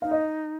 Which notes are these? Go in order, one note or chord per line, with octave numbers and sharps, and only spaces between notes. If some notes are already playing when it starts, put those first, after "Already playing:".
D#4 F5
D#5